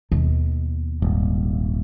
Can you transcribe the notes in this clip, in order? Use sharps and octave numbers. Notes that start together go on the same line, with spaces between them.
D#2 B2
D#1 G#1